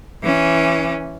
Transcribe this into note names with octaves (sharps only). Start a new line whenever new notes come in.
E3 C#4